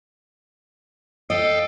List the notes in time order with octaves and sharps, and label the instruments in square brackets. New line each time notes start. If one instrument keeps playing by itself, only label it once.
[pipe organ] A4 F5 G5 [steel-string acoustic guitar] D#5